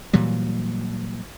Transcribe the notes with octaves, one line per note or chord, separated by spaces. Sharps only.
A#2 E3 F#3 G3